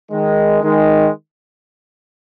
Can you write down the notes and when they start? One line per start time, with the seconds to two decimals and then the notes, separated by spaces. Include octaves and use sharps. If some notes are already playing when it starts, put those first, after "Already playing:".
0.11 D#3 G#3
0.63 D#3 G#3